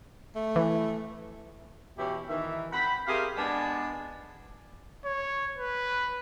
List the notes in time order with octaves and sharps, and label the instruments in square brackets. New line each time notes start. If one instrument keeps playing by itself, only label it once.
[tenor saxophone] A3
[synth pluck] E3
[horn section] B2 E3 C#4 E4 G4
D#3 E3 E5
C4 F#5 G5 B5
C4 G4 G#4 A#4 E5 F5
G#3 B3 D4 D5 G#5 A5
[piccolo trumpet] C#5
B4